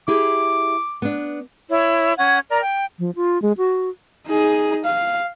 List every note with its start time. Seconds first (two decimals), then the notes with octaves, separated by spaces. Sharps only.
0.08 E4 G4 G#4 D6
1.02 B3 D4
1.69 E4 C#5
2.17 C#4 F#5 G#6
2.49 A#4 D5 A#5
2.61 G5
2.99 F3
3.16 F4
3.42 G#3
3.58 F#4
4.27 D#4 G#4
4.85 F5